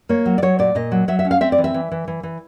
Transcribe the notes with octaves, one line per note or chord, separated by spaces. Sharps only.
A#3 C#5
F#3
D5
F#3 C#5
A#2 D5
A#2 D#5
F#3
F#3 E5
E5
C#4
F5
C4 E5
D5
E3
E5
E3
E3
E3
E3